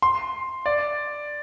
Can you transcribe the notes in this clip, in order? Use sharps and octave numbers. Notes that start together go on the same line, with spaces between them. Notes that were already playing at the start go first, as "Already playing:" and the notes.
C6
D5